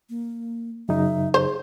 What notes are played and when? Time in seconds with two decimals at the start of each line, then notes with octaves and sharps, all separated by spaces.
0.10 A#3
0.89 F#2 C#3 D#4 E5
1.34 G#4 C5